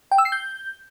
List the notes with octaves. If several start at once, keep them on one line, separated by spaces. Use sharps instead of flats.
G5
E6
C7
G6